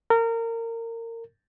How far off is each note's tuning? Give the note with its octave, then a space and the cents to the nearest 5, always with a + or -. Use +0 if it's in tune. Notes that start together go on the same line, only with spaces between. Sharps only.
A#4 -25